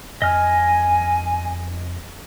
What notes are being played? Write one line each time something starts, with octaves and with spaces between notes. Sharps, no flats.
F2 D#5 G#5 F6